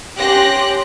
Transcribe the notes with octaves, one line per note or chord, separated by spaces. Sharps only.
C#4 G4 C6 F#6 A#6